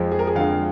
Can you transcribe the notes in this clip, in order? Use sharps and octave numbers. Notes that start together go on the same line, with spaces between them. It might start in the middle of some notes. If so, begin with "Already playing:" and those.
Already playing: F2 F3 G#3
G#4
A#4
G#4
F2 D3 G#3 F5